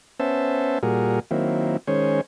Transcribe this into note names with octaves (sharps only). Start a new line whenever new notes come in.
B3 C#4 C5 E5 A5
A#2 G3 F#4 G#4 A#4
D#3 F#3 A#3 C4 E4
D#3 G#3 C#4 C5 C#5